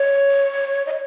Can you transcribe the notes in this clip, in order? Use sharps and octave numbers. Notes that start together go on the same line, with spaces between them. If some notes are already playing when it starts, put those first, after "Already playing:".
Already playing: C#5
D#5
C#5